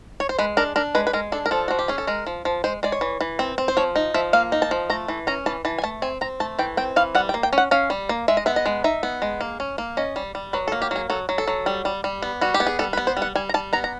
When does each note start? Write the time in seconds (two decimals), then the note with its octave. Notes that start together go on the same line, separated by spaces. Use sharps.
0.20 C#5
0.29 C5
0.39 G#3 B4
0.57 D4 A#4
0.76 D4 A#4
0.95 G#3 B4
1.07 B4
1.13 G#3 A#4
1.32 D4 A4
1.46 A#4
1.51 F3 A4
1.68 F3 F#4
1.79 G4
1.88 C#4 G#4
1.98 A4
2.07 G#3 A#4
2.27 F3
2.45 F3
2.64 G#3 C5
2.83 G#3 D5
2.92 C#5
3.01 E3
3.21 E3
3.39 C4
3.58 C4
3.68 C5
3.77 F3 C#5
3.96 D#4
4.14 F3 E5
4.33 A#3 F5
4.52 D#4
4.62 A5
4.71 F3
4.90 A3 A#5
5.08 E3
5.27 C#4 A#5
5.46 E3 A5
5.65 E3 A5
5.78 G#5
5.83 A3 A5
6.02 C4 G#5
6.21 C4 A#5
6.40 A3 A5
6.59 E3 G5
6.77 C4 G5
6.96 E3 F5
7.15 G3 F#5
7.29 G5
7.34 A#3
7.43 G5
7.53 C#4
7.58 F#5
7.71 C#4 F5
7.90 G3
8.09 A#3
8.28 G#3 E5
8.37 D#5
8.46 B3 E5
8.56 D#5
8.66 G#3
8.84 D#4 E5
9.03 B3
9.22 G#3
9.41 A#3
9.60 C#4
9.78 A#3
9.97 C#4 D#5
10.16 G3
10.35 G3
10.53 F#3 B4
10.68 A4
10.72 A#3
10.82 G4
10.91 F#3 G#4
11.10 F#3 A4
11.29 F#3
11.38 A4
11.48 F#3
11.66 G3
11.85 G3
12.04 G3
12.22 B3
12.41 G3 F#4
12.54 G4
12.60 B3
12.67 G#4
12.79 G3 A4
12.93 B4
12.97 B3
13.07 C5
13.17 G3
13.22 F#5
13.35 G3 G#5
13.49 A#5
13.54 G3 A5
13.73 B3 A#5
13.84 A#5